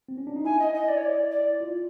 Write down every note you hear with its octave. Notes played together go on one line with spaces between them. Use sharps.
C4
C#4
D4
D#4
E4 G#5
D#5
D#5
D5
C#5
D5
D5
F4